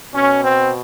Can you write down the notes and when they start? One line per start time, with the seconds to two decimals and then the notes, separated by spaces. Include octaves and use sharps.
0.14 B2 C#4
0.42 C4